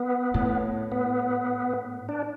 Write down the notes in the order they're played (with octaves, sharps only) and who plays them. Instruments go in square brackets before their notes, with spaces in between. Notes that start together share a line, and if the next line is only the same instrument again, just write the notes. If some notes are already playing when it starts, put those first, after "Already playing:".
Already playing: [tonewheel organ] B3
[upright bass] A2
[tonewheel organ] B3
D4